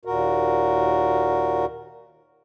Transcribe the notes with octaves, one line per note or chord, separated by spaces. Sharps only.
D#2 A#2 F#4 A#4